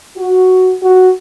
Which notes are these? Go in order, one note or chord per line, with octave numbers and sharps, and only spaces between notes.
F#4
F#4